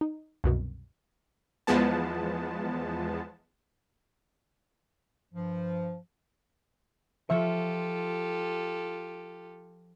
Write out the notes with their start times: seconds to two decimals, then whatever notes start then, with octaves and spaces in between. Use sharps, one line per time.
0.01 D#4
0.44 C2 F#2 B2
1.67 E2 F3 G#3 B3 A5
5.33 G2 F3
7.30 F3 F4 G4 A4 E5 C#6